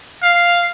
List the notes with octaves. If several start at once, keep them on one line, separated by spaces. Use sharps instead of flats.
F5